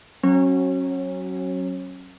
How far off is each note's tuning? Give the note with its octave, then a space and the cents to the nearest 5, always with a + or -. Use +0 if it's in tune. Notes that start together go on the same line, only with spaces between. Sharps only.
F#3 +5 C#4 -30